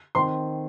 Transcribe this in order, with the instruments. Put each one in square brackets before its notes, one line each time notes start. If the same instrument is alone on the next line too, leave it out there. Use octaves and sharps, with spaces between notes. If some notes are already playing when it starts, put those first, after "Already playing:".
[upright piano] D#3 C4 C6